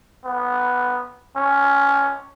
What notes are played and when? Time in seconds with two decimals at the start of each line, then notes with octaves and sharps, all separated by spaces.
0.25 B3
1.36 C#4